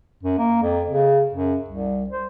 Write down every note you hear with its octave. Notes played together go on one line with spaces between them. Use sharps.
F#2
A#3
F2
C#3
F#2
C2
C5